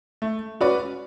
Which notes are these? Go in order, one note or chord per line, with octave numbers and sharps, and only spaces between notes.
A3
C#4 F#4 B4 D5